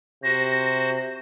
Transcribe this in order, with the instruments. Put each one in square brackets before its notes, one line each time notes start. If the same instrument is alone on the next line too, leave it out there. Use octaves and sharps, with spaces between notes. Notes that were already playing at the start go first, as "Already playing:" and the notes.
[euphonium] C3 [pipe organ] F#4 C5 [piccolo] A#6